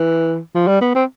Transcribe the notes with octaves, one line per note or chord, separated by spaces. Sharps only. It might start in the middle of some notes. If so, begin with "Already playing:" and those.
Already playing: E3
F3
G3
B3
C4